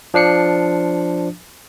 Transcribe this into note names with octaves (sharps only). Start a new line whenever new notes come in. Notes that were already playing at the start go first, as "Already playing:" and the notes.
F3 D4 C7 C#7